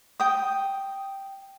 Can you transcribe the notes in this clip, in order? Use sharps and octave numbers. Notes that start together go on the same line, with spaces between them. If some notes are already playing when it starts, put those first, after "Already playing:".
G5 D#6